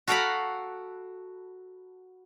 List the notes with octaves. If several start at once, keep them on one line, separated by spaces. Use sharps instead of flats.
F#4 A4 F5 G5 A#5 B5